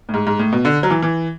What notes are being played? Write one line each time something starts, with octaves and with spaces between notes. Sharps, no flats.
A2
G#2
G#2
A2
B2
D3
F#3
E3
E3